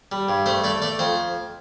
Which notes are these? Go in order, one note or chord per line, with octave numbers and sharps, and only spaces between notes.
G3
G2
A3 C5
A3 D5
A3 D5
F2 C5